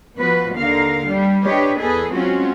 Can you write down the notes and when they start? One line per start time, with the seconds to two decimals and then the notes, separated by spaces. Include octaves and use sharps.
0.17 F3 B3 F#4 B4
0.55 D#2 D3 A#4 F5
1.09 G3 D4
1.44 D4 G4 B4 C#5 D#5
1.79 E2 G#4 A4 B4
2.13 F#3 G#3 C4 C#4 F4 F#4